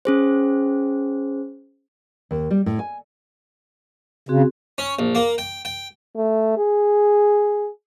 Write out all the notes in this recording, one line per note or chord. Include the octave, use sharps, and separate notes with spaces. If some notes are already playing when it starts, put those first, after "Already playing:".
C#4 G#4 C5
D#2
G3
A2
G#5
C#3 C4 F#4 G#4
C#4
A#1
A#3
G5
G5
A3
G#4